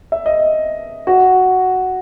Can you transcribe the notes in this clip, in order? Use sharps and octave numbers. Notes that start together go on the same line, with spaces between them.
E5
D#5
F#4